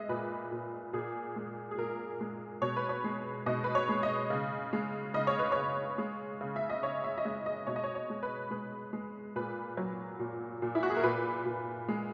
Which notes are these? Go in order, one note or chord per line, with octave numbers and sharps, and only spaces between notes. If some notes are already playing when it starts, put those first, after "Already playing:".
Already playing: G#3 D#5 E5
A#2 B4
A#2
A#2 G#4
G#3
G#4
A#2 A#4
G#3
B2 C#5
B4
C#5
G#3
B2 D#5
B4
C#5
G#3
D#5
C#3
G#3
C#3 D#5
C#5
B4
C#3 C#5
G#3
C#3
E5
D#5
C#3 C#5
E5
D#5
G#3 E5
D#5
B2 C#5
D#5
C#5
C#5
G#3
B4
G#3 B4
G#3
A#2 B4
F#3
A#2
A#2
E4
F#4
G#4
A#4
A#2 B4
A#2
G#3